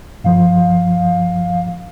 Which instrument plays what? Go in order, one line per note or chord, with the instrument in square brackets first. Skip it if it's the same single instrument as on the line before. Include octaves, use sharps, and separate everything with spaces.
[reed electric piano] G2 F3 [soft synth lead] F5